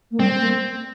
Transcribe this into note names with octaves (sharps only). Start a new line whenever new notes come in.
A#3
G3 C4
A#3